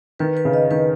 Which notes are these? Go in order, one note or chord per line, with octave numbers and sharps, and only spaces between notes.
D#3 B4
B4
C#3
D#5
D#3 B4